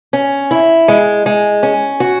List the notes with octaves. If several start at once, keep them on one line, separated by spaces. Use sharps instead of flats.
C#4
E4
G#3
G#3
C#4
F#4